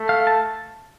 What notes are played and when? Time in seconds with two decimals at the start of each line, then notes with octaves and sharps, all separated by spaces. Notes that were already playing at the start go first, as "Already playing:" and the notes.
Already playing: A3
0.09 F5
0.27 A5